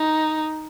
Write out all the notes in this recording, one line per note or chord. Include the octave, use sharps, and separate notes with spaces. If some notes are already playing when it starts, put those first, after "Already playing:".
Already playing: D#4